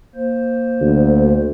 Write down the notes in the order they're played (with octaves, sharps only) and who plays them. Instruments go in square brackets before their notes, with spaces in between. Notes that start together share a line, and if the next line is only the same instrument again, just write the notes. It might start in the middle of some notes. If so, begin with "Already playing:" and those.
[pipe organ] A#3 C5
[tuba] D2